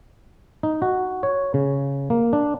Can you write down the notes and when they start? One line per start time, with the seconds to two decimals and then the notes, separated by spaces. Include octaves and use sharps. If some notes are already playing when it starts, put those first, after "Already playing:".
0.63 D#4
0.82 F#4
1.23 C#5
1.54 C#3
2.10 A#3
2.33 D4